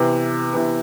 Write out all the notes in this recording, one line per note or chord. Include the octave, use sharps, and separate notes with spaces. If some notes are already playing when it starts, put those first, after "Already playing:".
Already playing: C3 E3 B3
C3 E3 B3